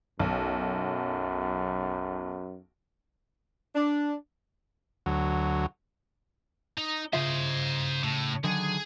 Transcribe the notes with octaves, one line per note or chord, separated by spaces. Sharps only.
B1 F#2
D4
D2 F#3
D#4
C#3 F4 C5 D#5 E5
A2
D3 D#3 F#3 G#4